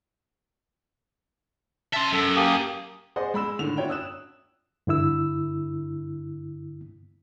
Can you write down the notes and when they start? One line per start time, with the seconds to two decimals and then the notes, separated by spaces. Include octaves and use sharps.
1.93 E5 A5 C6
2.13 F#2 A4
2.36 A#3 G4 D#6
3.16 G#4 C5 D5 D#5 F#5
3.34 G#3 B5 E6 E7
3.59 A2 D3 D#3 F7
3.77 D4 F4 F#4 C#5 E5 G5
3.89 D#6 E6 F#6 E7
4.87 G2 D3 E4 E6